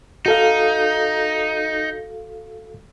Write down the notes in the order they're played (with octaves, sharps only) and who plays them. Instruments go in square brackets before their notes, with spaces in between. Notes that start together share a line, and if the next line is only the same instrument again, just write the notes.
[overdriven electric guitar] D#4 [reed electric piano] F#4 A4 F5